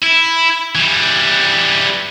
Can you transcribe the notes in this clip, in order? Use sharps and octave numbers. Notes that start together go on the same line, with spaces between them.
E4
E3 G3